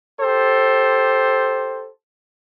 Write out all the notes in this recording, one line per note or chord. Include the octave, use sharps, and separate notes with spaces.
G4 A4 C5